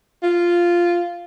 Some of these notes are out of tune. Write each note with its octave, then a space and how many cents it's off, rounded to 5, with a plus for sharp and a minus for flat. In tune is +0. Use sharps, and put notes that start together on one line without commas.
F4 -5